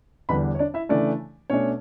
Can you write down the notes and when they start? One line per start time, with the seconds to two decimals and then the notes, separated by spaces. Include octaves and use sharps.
0.29 E2 D3 G3 D4 B4 B5
0.55 C#5
0.59 D4 D5
0.74 E4 E5
0.89 C#3 E3 A3 D4 D5
1.50 B2 A3 C#4 D4 C#5